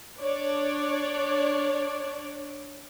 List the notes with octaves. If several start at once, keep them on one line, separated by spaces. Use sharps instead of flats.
D4 C#5 D5